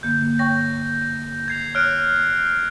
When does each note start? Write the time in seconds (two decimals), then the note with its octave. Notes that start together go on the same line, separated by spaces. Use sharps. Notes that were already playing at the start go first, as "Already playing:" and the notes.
0.03 G2 D3 A#3 G6
0.39 C#5 G5 C#6 A#6
1.48 G#6 C7 F7
1.75 C#5 F6 F#6 D7